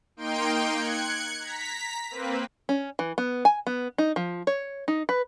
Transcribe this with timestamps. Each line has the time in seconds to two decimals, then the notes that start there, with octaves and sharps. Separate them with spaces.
0.17 A#3 D#4 G5 C6 D7
0.76 F#6 G#6 C#7
1.39 A#5 B6
2.11 A#3 C4 B4
2.69 C#4
2.99 E3
3.18 B3
3.45 G#5
3.67 B3
3.98 D#4
4.16 F3
4.47 C#5
4.88 D#4
5.09 B4